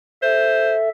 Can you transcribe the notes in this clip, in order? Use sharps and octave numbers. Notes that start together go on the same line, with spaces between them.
A4 C5 E5